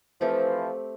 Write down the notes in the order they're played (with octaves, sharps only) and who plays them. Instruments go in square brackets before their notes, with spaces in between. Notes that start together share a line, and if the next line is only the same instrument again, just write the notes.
[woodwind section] E3 F3 [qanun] A3 C4 G4